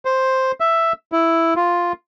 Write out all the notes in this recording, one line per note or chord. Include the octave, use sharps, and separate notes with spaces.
C5
E5
E4
F4